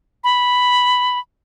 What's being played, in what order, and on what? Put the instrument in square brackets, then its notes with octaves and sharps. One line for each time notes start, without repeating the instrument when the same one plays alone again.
[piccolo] B5